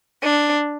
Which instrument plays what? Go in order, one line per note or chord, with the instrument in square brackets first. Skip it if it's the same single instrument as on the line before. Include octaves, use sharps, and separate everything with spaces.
[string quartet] D4